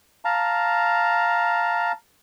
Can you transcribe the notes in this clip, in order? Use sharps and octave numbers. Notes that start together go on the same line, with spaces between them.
F5 A5 A#5